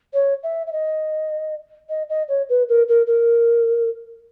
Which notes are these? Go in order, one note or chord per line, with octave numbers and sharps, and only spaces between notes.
C#5
E5
E5
D#5
D#5
D#5
C#5
B4
A#4
A#4
A#4